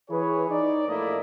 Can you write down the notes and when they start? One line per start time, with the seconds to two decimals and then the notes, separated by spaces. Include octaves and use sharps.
0.11 E3 G#4 B4 C#5
0.51 D#4 D5
0.88 A#1 A3 A#3 E4 D5 D#5